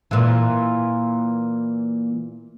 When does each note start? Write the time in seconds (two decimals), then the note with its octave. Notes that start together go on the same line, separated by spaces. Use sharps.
0.11 A#2 E3